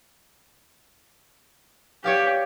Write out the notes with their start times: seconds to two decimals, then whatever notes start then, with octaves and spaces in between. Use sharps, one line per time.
2.04 G4 C#5 D5 F5